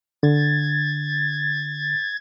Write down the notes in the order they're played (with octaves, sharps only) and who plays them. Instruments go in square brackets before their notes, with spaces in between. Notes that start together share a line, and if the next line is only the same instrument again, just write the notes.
[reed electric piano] D3 [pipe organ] G#6 A6